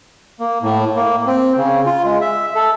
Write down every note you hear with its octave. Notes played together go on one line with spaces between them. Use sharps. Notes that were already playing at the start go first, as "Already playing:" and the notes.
A#3
A2
A#3
C4
C#3
F4
G#3
E5
A4